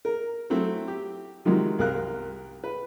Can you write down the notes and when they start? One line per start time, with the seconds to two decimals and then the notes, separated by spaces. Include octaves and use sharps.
0.05 A#4
0.50 F#3 A3 C4 E4
0.88 G4
1.45 C3 D#3 F3 F#3 G#3
1.79 C2 A#4 F5 F#6
2.64 B4